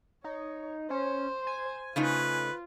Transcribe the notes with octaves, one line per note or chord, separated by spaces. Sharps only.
D#4 C#5
C#4 C5
G#5
C#3 A3 D#4 F4 B4